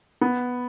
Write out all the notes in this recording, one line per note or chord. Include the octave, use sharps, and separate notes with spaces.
B3